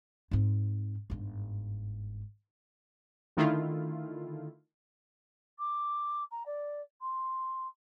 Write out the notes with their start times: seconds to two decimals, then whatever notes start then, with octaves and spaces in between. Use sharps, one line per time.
0.31 G#2 C4
1.10 G1 G#2
3.37 D3 D#3 A3 E4 F4
5.59 D6
6.31 A#5
6.46 D5
7.01 C6